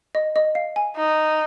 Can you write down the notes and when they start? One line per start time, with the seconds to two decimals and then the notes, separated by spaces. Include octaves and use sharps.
0.15 D#5
0.36 D#5
0.55 F5
0.76 G#5
0.96 D#4